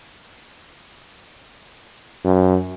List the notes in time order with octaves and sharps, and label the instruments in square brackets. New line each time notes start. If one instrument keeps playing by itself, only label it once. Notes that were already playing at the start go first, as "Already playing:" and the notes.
[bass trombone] F#2